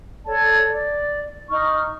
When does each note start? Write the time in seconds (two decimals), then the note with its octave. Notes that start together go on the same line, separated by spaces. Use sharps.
0.25 A4 C#5 D5 A5
0.67 D5
1.49 D#4 C#6 F6